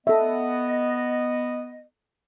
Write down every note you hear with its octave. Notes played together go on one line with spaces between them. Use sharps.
B3 A4 D#5 E5